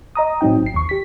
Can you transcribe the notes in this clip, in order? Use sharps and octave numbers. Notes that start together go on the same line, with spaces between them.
D#5 A#5 D#6
A2 F#3 C4 D#4 G5
G#1 C7
D#2 C#6
G4 B6